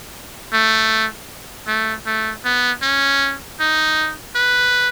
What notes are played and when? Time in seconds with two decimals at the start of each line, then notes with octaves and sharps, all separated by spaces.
0.53 A3
1.67 A3
2.06 A3
2.45 B3
2.82 C#4
3.60 D#4
4.35 B4